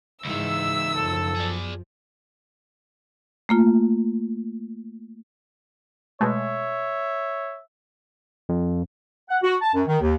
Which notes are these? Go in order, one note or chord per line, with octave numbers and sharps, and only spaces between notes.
C#2 G#2 D#3 E3 G#3 E5 E6
F#2 F3 A4
G#4 D5
A3 A#3 F4
B2 G#3 A3 C#5 E5
F2
F#5
F#4
A5
F#2
D#3
D#2